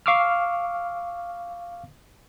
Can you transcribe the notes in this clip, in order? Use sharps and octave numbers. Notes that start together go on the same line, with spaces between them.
F5 C#6 D6 E6 F6